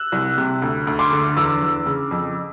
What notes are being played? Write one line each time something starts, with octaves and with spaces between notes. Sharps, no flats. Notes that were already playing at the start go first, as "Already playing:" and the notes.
Already playing: E6 F#6
C2
C3
D2
D2
C6 D6
D3
E2 D6 E6
E2
C#3
F2